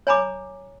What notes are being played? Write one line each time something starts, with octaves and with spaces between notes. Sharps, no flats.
C#5 G#5 A#5 B5 D6